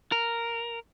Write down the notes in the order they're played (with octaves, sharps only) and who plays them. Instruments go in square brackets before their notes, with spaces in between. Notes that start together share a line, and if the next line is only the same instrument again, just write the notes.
[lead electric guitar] A#4